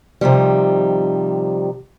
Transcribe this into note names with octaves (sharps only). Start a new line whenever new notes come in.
C3 D#3 F3 G3